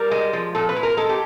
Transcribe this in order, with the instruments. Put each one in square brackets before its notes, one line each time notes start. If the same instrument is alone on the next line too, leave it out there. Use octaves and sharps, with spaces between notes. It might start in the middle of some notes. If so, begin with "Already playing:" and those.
Already playing: [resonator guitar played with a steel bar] G3 A#4
G#3
F3
A#2 A4
B4
G#3
A#4
G#3 A4
G4